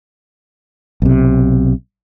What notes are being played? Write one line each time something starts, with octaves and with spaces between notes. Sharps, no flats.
B1 C3